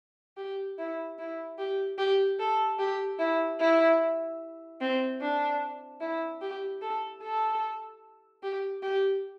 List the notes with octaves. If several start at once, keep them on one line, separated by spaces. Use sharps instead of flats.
G4
E4
E4
G4
G4
A4
G4
E4
E4
C4
D4
E4
G4
A4
A4
G4
G4